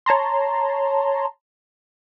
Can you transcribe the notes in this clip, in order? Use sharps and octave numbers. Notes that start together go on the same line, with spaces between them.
C#5 A5 A#5 C6